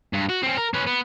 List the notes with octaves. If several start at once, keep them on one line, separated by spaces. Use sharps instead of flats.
G2
F#4
C4 C#4
A#4
C#4 B4
B3